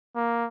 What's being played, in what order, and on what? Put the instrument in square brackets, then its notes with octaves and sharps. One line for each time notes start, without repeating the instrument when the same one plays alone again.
[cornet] A#3